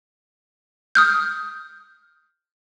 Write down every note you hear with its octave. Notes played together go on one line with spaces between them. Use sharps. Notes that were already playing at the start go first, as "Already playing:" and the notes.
D#6 F6 G6